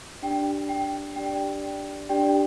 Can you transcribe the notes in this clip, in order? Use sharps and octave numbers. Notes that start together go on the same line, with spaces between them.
D4 G4 D5 G5
G5
D4 G4 D5 G5
D4 G4 D5 G5